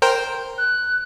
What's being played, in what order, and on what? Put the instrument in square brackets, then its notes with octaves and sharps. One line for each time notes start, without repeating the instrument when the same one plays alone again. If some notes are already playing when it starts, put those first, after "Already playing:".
[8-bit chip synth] A#4 C5 G5
[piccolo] F#6